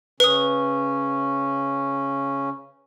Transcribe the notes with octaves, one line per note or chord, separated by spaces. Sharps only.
C#3 C#4 B4 D#6